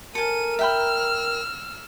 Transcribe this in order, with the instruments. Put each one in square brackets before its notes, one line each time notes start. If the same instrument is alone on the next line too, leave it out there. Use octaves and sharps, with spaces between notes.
[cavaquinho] A4 G#5 [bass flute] A#4 [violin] D#7
[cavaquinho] E5 G5 B5 [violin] E6 F6